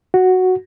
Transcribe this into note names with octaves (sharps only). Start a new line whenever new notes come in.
F#4